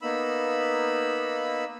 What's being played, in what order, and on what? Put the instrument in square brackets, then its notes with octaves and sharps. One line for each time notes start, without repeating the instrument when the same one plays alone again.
[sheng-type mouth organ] A#3 B3 D#4 B5 E6